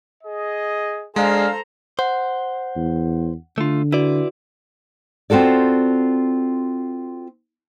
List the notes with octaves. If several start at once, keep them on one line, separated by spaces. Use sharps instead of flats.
G#4 D#5
G#3 D4 G#4 A4 C5 F5 A#5
C5 F#5
E2
D3 A3 F4
E4 F#4 B4 D5
C4 F4 F#4 A4 D5